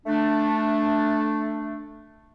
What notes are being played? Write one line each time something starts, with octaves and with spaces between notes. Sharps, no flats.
A3 D4